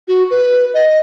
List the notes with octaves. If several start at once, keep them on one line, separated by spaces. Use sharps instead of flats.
F#4
B4
D#5